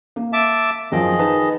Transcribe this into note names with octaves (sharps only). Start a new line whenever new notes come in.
A#3
E5 A5 D6
F#2 D#3 F3 G#4 D#5
D#4 B4 A5